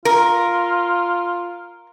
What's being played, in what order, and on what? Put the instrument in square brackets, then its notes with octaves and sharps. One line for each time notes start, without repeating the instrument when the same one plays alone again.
[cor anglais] F4 [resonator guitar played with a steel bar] A#4